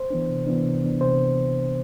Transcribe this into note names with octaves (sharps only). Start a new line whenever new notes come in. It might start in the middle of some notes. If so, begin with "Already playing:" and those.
Already playing: C5
E3 B3 D4
C3
E3 B3 D4
C3
E3 B3 D4
C3 C5